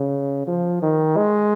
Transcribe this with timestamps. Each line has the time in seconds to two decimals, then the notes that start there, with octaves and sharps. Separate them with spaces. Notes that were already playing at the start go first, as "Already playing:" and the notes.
Already playing: C#3
0.48 F3
0.82 D#3
1.17 G#3